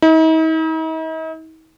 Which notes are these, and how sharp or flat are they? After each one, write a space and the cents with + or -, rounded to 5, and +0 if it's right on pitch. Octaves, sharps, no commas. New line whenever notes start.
D#4 +45